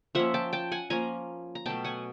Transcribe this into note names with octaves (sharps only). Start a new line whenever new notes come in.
F3 A#3 C#4 E5 F#5
G5 A5
G5 A5
F#5 G#5
F3 A#3 C#4 G#5 A#5
A#5
B2 F#3 A3 G5 A5
F#5 G#5